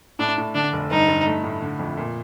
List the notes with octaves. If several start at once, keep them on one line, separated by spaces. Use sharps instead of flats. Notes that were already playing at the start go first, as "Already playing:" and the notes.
A2 D4
A2
D3 D4
F1
G2 D#4
G2
A3
A2
D3
F2
A#2